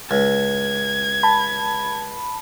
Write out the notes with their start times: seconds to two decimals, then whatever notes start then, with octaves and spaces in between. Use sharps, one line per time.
0.11 C#2 G#6
1.23 A5 B5